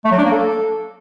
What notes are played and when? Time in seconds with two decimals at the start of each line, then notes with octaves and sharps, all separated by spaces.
0.05 A3
0.11 F#3
0.18 D4
0.25 A#3
0.31 A4